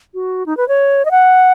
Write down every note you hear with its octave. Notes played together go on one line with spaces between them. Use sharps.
F#4
D#4
B4
C#5
D#5
F#5